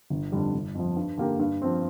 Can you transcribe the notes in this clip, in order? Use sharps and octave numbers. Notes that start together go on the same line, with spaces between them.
G1
F2 D3 G3 D4
G1
F2 F3
G2
D3 A#3 G4 A#4
G2
F3 C4